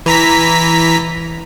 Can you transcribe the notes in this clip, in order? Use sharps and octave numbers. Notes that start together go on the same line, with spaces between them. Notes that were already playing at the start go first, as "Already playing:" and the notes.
E3 A#5 B6